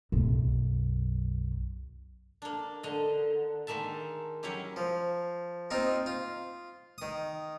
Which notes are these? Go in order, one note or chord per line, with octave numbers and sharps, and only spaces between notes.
B1 F#2
A#3 D4
D3 D#5
D#3 G#3 A#3 E5 A5
F#3 C#4 E4 G4
F3
A#3 C4 D#4 F4
F4
D#3 D#6